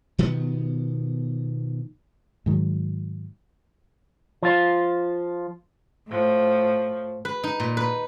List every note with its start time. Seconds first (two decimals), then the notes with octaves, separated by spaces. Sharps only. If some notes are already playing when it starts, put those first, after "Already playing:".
0.18 B2 D#3 F3 B3
2.46 G#2 D#3 F#3
4.43 F3 F4
6.08 A2 F3
7.25 B4
7.44 D#4
7.60 A#2
7.77 B4